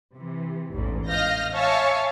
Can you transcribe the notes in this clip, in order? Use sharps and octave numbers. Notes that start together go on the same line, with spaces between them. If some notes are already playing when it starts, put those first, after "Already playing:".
C3 E3
A1 E2 G#2
D#5 F5 F6 G6 A#6
C#5 E5 F5 G#5 A5